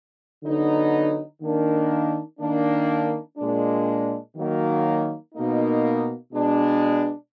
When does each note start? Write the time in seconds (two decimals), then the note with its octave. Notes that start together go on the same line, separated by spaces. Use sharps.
0.43 D3 F#3 B3 D#4
1.42 D#3 A#3 D4
2.39 D#3 A#3 D4
3.38 A#2 G#3 D4
4.36 D#3 F#3 A#3
5.35 B2 A#3 D#4
6.33 B2 G#3 B3 D4